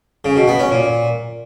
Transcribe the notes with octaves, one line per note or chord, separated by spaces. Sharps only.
C#3
B2
B3
C#4
A#2